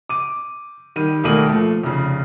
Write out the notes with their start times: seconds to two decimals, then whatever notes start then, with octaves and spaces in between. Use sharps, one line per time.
0.09 D6 D#7
0.96 D#3 G3 D#7
1.24 E1 D#2 A3 A#3 D#7 F#7
1.49 F3 A3
1.84 F1 C#3